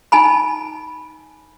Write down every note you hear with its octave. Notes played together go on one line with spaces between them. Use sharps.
D#4 G#5 A5 B5